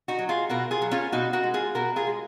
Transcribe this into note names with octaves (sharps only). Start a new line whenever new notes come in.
D#4 F#4
F#3
F4 G#4
B2 F#4 A#4
F4 G#4
F#3
C#4 F4
B2 D#4 F#4
F#4 A#4
G#3
F4 G#4
B2 F#4 A#4
F4 G#4
G#3